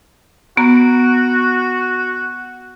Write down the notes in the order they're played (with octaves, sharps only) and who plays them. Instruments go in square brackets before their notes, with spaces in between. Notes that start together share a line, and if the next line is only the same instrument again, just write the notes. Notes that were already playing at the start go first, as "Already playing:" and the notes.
[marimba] B3 A#5 [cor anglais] F#4